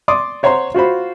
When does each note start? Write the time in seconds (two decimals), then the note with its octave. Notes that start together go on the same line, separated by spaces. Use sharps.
0.08 D5 C6 D6 D#6
0.43 C5 C#5 F#5 A#5 C6
0.74 F4 F#4 C5 B5